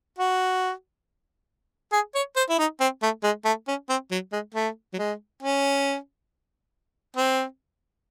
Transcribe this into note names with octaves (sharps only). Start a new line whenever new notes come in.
F#4
G#4
C#5
C5
E4
D#4
C4
A3
G#3
A3
C#4
C4
F#3
G#3
A3
F#3
G#3
C#4
C4